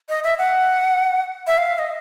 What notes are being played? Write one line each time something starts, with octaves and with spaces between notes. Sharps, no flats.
D#5
E5
F#5
E5
F5
D#5